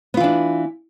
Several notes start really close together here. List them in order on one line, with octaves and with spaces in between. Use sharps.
B3 F4 E3 D4